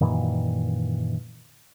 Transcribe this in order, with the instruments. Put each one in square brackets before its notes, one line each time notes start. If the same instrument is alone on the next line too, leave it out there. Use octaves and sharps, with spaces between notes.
[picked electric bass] F#2 A#2 D#3 E3